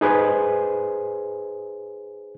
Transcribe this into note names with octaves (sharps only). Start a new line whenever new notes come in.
D#4 G#4 B4 C5